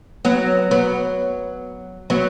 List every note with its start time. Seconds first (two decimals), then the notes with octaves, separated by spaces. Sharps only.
0.25 F#3 B3
0.71 F#3 B3
2.10 F#3 B3